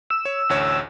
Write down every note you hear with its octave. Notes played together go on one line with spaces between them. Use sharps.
E6
C#5
A1 D2 C#5